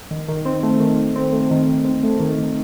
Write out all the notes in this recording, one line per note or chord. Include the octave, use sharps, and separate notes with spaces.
D#3
D#3
C4
A3
D#3
D#3
C4
A3
D#3
D#3
C4
A3
D#3
D#3